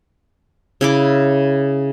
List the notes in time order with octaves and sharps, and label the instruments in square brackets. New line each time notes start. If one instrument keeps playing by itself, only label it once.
[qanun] C#3 E4 D6